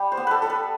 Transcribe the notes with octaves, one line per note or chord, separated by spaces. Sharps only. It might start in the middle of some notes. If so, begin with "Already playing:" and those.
Already playing: G3
C5
B3
A4 B4
G3 A4
B4